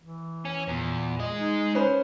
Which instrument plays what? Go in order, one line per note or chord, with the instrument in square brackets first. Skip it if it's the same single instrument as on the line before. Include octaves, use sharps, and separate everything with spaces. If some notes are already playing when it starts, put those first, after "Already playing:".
[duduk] E3
[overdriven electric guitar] C#4
[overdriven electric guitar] E2 [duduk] A#2
[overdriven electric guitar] G#3 D#5
[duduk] D#4
[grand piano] C#4 B4 C5